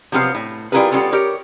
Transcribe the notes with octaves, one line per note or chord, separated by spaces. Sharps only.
C3 F3 F#3 B3 G4 F5
A2
G3 E4 F4 G#4 A#4 B4
G3 B3 C#4 F4 A4
G4 A#4 C#5